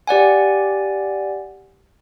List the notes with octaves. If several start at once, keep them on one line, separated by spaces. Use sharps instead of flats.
G4 D5 F#5 G#5